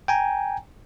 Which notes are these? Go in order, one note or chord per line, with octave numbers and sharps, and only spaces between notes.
G5 G#5 A#5